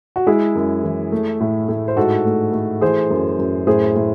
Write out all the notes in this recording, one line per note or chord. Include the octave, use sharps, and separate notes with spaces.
F#4
G#3 E4 G#4
F#2
E3
A3
A2
A2
C5
G#2 F#4 A4
A3
A3
E3 G#4 C5
F#2
F#2
A2 G#4 C5
A2